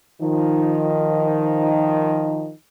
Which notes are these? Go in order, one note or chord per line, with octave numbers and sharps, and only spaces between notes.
D#3 F3 D#4